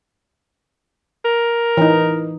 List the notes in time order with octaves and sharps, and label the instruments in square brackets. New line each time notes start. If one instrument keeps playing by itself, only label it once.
[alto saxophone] A#4
[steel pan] E3 D#4